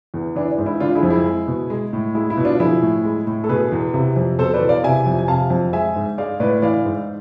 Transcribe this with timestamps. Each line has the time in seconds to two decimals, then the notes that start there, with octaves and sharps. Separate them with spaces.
0.14 E2
0.36 E3 D4
0.51 D4
0.58 G#2
0.66 E4
0.80 D3 D4 F4
0.95 E4 G#4
1.03 F2
1.10 E4 G#4
1.25 G#3
1.48 B2
1.70 G#3
1.93 A2
2.15 G#3 E4
2.30 E4
2.37 B2
2.45 D4 F4
2.60 F3 E4 G#4
2.82 A2
3.04 G#3
3.27 A2
3.44 A4
3.49 B2 G#4 B4
3.72 E2
3.94 C3
4.16 F2
4.39 B2 A4 C5
4.54 B4 D5
4.61 E2
4.69 D5 F5
4.84 C3 E5 G#5
5.06 F2
5.19 G#5
5.28 C3 F5 A5
5.50 F2
5.73 G#3 E5 G#5
5.96 G#2
6.18 G#3 D5 F5
6.40 A2 B4 D5
6.62 E3 D5 F5
6.85 G#2